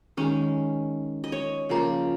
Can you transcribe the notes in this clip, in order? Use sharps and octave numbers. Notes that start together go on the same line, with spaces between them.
D#3 G#3 C#4
D#5
C#5
C#3 F3 A#3 A#4